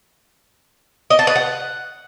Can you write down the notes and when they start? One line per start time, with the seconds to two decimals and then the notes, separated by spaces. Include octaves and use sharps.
1.10 D#5
1.19 A5
1.27 B4
1.36 F#5